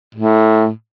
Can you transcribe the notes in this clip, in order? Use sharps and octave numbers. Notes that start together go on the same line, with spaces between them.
A2